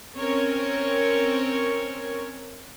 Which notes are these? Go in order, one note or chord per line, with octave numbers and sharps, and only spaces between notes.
C4 C#4 A#4 C#5